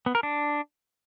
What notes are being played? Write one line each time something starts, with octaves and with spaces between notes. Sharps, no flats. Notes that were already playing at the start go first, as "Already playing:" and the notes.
B3
A#4
D4